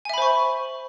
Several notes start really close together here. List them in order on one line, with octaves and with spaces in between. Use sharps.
G#5 E5 B5 C5 C#6